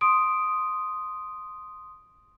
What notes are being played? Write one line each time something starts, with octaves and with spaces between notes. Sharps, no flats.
C6 D#6 D7